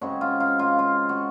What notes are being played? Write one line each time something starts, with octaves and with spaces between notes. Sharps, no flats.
C#3 G#3 C4 F#4
F4
F4
F4
F4
F#4